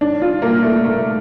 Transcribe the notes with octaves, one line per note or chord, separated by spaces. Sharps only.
D4
F4
A#3
A3
A3